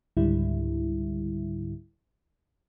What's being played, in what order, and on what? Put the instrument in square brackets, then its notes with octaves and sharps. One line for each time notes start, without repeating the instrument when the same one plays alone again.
[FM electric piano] C#2 G#2 D3 G3 E4